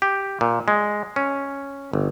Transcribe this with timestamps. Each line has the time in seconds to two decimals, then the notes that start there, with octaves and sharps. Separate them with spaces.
0.02 G4
0.41 A#2
0.68 G#3
1.16 C#4
1.93 G1